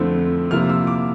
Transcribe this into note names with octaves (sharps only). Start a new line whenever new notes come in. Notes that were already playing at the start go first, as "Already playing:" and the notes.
Already playing: F2 D3 A3 C4 E4
C3 F3 A#3 E4 F6
E6
D6